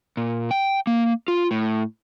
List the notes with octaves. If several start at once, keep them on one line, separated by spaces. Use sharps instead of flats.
A#2
G5
A#3
F4
A2